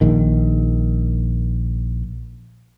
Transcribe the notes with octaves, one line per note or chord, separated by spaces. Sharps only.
A#1 D#3